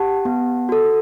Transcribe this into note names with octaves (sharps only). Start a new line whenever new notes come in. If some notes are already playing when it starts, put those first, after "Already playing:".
Already playing: G4 F#5 A5
B3
F#4 A4